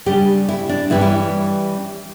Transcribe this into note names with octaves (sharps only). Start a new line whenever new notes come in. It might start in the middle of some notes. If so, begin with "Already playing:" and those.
C#3 G3 D4 G4
E4
D4
G2 E3 G3 C#4 E4
E4